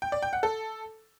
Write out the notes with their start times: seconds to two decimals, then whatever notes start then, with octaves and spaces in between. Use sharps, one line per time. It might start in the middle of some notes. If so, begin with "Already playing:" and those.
0.02 G5
0.12 D5
0.22 G5
0.33 F#5
0.43 A4